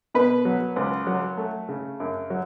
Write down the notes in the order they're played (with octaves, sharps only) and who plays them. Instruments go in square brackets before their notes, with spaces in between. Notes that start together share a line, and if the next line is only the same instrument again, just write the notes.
[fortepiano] B2 B4
F#3
C#2
F#3
A3
C#3
F#2
F#3